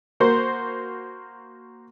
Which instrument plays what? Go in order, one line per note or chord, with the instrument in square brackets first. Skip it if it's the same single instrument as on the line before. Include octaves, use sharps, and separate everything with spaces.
[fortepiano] A#3 F#4 A#4 C5